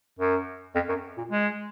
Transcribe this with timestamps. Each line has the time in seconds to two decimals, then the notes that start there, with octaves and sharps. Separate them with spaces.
0.19 F#2
0.75 F2
0.89 F#2
1.18 A#2
1.31 G#3